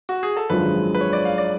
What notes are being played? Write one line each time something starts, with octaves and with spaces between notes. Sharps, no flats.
F#4
G#4
A4
G#1 F#2 F3 G#3 D4 B4
B4
C#5
D5
F5
D5